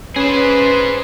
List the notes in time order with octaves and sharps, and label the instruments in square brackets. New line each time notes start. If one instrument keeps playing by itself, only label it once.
[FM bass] C#4 [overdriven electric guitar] G#4 C5 [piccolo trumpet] B4